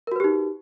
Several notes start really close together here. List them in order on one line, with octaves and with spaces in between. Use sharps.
A#4 F#4 B4 G4 D#4